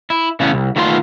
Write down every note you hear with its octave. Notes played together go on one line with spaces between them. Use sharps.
E4
C#3 E3 A3 B3 C#4
C2
D#3 A3 B3 F4 D5 C6